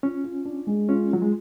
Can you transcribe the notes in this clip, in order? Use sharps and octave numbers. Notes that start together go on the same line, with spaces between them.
C#4 F4
F4
D4
G#3
C#4 F4
F#3 F4
G#3